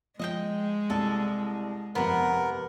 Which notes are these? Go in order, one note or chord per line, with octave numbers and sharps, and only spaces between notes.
F3 G#3 D#5 E5 G5
C2 A4
G1 F2 C3 B3 A#4